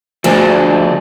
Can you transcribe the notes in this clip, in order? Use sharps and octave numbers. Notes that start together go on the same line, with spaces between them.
D2 F3 G#3 D4